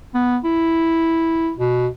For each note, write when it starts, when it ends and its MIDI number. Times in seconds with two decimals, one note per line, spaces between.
0.14 0.38 59
0.44 1.52 64
1.59 1.88 47